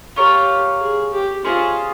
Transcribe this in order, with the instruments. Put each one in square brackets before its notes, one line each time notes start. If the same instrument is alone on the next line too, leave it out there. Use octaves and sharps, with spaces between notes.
[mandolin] F4 A#4 C#5 F5 [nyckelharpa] G4
[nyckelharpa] G#4
G4
[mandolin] C#4 G#4 C5 D#5 [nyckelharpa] F4